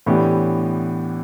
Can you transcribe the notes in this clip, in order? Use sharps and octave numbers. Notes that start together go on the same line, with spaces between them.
A2 E3 B3 D4 G4